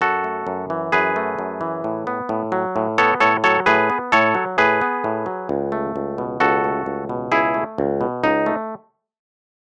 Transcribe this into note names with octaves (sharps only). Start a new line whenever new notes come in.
F#2 F#4 A4
A3
F#2
E3
F#2 G#4 B4
A3
F#2
E3
A2
B3
A2
F#3
A2
B3 A4 C#5
A2 A4 C#5
F#3 A4 C#5
A2 G#4 B4
B3
A2 A4 C#5
F#3
A2 G#4 B4
B3
A2
F#3
C#2
A3
C#2
B2
C#2 F#4 A4
A3
C#2
B2
C#2 E4 G#4
A3
C#2
B2
C#2 D#4
A3